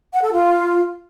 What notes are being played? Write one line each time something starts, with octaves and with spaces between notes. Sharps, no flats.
F#5
A4
F4